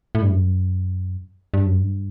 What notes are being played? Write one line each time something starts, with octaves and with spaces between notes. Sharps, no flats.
A2
G2
F#2
G2
F#2
G2